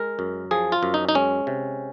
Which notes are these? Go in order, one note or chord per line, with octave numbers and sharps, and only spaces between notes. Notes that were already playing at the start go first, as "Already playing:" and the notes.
Already playing: G#3 A#4
F#2
F3 G#4
F4
F#2
D#4
D#4
G#3 C#4
C3